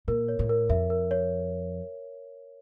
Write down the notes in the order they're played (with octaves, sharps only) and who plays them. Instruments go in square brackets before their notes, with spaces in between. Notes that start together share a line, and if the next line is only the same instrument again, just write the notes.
[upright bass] A#2 [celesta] A#4
[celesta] C#5
[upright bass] A2
[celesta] A#4
[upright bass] F2 [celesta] E5
[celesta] A#4
C#5